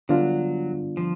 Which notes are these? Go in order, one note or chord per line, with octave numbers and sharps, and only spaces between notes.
D3 F#3 G3 B3 D4 F4
F3